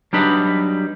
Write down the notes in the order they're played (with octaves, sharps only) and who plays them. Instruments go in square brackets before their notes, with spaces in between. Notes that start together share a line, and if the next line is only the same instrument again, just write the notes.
[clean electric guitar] F#3 G3 D4 D#4 B4